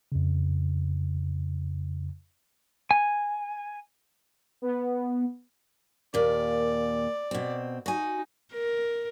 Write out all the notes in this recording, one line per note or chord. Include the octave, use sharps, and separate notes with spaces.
F2 C#3
G#5
B3
D#2 A#2 D5
B2 C4
D#4 F#4 G#5
A#4